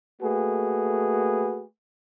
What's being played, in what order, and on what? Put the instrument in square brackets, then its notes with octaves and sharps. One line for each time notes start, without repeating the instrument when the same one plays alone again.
[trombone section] A3 A#3 F#4 G#4 B4